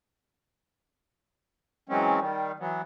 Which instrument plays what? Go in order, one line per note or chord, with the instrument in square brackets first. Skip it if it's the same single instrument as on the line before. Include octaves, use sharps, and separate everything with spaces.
[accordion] E3 F#3 G#3 C4 C#4
D#3 G3
E3 F#3 B3